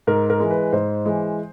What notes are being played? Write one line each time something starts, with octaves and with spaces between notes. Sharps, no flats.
G#2 A#4
A#4
E3 G#3
B4
G#2 C5
E3 G#3